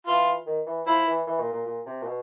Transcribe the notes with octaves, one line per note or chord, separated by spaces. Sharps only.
E3 F4
D#3
E3
F3 E4
E3
E3
A#2
A#2
A#2
C3
A#2
B2